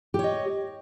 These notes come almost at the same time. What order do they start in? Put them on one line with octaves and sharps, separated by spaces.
G4 C#5 D#5